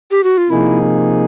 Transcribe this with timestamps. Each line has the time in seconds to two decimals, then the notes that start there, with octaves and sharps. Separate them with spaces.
0.11 G4
0.24 F#4
0.38 F4
0.50 C3 F3 A#3 D#4 E4 G#4